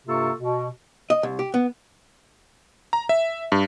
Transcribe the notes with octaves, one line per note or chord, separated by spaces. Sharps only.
G2 C3 A#3 F4 A4 C#6
B2
D#5
C2
G4
B3
A#5
E5
G2